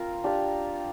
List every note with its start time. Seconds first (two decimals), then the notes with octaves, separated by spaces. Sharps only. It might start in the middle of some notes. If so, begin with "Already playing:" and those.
Already playing: C4 F4 A#4 F5
0.24 D4 G4 D5 F5